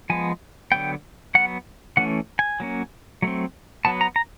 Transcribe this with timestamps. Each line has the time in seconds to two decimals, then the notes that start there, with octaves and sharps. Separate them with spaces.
0.10 F3 G#3 B3 G#5
0.72 D3 F#3 B3 G5
1.35 F#3 B3 F#5
1.97 E3 A3 C#4 F#5
2.39 G#5
2.60 F#3 A#3 C#4
3.22 F#3 A3 C4
3.85 F#3 B3 A5
4.01 A#5
4.16 A#5